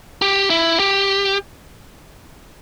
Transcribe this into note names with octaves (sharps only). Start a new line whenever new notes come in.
G4
E4
G4